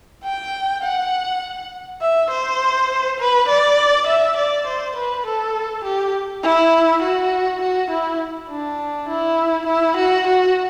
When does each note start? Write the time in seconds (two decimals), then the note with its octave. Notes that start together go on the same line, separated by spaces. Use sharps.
0.24 G5
0.83 F#5
2.01 E5
2.30 C5
3.19 B4
3.48 D5
4.07 E5
4.36 D5
4.67 C5
4.95 B4
5.26 A4
5.84 G4
6.43 E4
7.02 F#4
7.61 F#4
7.90 E4
8.49 D4
9.08 E4
9.67 E4
9.97 F#4
10.27 F#4